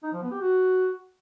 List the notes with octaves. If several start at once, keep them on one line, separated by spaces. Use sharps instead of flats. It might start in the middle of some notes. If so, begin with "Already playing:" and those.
D#4
F3
B3
G4
F#4